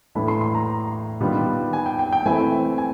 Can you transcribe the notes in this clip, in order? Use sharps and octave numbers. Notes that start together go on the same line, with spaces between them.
A2 E3 A3 D4 B5
C6
C6
A#5
D#3 G3 B3 D4 F4
G#5
G5
G5
G5
E3 A3 C4 E4 G#5
G#5